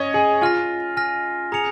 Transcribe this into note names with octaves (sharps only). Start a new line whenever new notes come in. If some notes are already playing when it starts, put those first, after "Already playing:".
Already playing: C#4 C#5 D#5
G#4
F4 G#5 F6 A#6
G#5 F6 A#6
G#4 A#5 D#6 C#7 F7